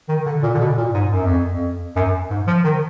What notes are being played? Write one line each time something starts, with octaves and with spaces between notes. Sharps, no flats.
D#3
D3
A#2
D3
B2
A#2
G#2
F#2
F2
F2
F#2
G#2
F3
D#3